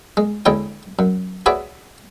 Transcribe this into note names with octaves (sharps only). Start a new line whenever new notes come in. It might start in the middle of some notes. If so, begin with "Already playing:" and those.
G#3
D2 G#3 E4 C#5 G5
F#2
F#4 G#4 B4 C#5 D5 E5